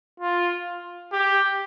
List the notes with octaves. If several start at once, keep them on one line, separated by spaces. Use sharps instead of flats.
F4
G4